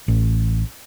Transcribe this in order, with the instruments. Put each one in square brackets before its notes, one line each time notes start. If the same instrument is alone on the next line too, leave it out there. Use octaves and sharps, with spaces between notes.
[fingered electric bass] A1